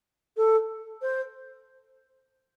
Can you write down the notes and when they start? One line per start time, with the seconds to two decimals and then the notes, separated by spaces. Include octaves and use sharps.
0.37 A4
1.02 C5